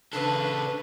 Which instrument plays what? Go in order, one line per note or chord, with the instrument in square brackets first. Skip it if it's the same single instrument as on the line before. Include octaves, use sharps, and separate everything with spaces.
[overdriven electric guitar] C#3 A4 [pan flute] D4 [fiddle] B4